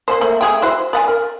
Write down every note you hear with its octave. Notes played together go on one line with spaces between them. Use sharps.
A#3 C#4 C5
A3 A#3
A3 G#4 G5
E4 F#4 C5
D5 F#5 G#5
A#4